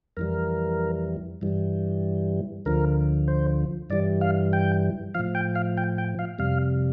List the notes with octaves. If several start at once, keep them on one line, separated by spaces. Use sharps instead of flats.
F2 E3 G3 A#4
G2 E3 G3
D2 D3 F3 A#4
C5
G2 E3 G3 D5
F5
G5
A2 F3 F5
G5
F5
G5
G5
F5
F2 C3 G3 F5